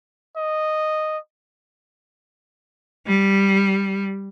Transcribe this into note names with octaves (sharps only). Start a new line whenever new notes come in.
D#5
G3